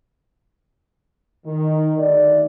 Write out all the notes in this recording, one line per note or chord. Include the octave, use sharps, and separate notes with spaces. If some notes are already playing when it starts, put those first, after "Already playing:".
D#3
D2 D#3 G3 A3 D5